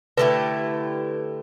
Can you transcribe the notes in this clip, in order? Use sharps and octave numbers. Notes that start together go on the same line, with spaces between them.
D3 A3 E4 G4 B4